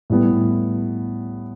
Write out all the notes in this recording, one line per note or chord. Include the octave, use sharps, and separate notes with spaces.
A2 G3 B3